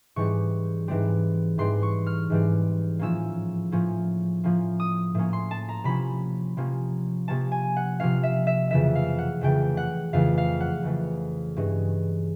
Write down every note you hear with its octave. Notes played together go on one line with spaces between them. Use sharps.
G#2 E3 G3 C4 C#6
G#2 E3 G3 C4
G#2 E3 G3 C4 C6
C#6
F6
G#2 E3 G3 C4
A2 F3 A#3 C#4 E6
A2 F3 A#3 C#4
A2 F3 A#3 C#4
D#6
A2 F3 A#3 C#4
C6
A5
A#5
C3 F3 A#3 C#4 B5
C3 F3 A#3 C#4
C3 F3 A#3 C#4 A5
G#5
F#5
C3 F3 A#3 C#4 F5
E5
E5
F2 C#3 E3 A3 E5
F5
F#5
F2 C#3 E3 A3 G5
F#5
F2 C#3 E3 A3 F5
F5
F#5
F2 C#3 E3 A3
G2 E3 G#3 C#4